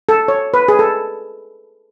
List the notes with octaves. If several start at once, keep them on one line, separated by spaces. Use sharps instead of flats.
A4
C#5
B4
G#4
A4